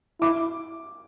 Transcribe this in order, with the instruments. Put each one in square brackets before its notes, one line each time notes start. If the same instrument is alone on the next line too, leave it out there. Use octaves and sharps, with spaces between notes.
[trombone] E4 [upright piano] D6